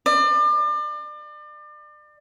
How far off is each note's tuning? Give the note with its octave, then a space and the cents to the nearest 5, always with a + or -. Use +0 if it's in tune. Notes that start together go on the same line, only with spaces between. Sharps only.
D5 +35